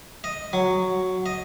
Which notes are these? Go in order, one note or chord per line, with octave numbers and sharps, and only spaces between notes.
D#5
F#3
D#5